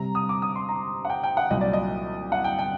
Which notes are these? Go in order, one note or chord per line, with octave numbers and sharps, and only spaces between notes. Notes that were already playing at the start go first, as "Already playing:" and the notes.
Already playing: C3 G3 C4 A#5
D#6
D6
D#6
C6
A#5
F#5
G5
G5
F#5
C2 A#2 F#3 D#5
D5
D#5
F#5
G5
G5